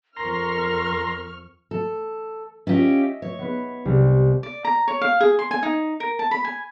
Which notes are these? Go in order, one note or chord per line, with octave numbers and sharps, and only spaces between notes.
F2 A#4 A#5 C6 C#6 F6
A4
C#4 F4 G4 D#5 E5
C#5
B3 B4
C2
D5
A#5
C#5
F5
G#4
C6
G#5
D#4
A#4
A5
B5
G#5